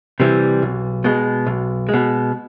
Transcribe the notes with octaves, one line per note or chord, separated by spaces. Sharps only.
C3 E3 G3
B1
B2 G#3
B1
B2 G#3